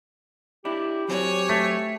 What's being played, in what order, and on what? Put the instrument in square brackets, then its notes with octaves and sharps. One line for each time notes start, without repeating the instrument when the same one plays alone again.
[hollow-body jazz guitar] D4 E4 [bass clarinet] G4
[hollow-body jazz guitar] F#3 C4 D4 [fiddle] C#5 G#5
[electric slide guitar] A3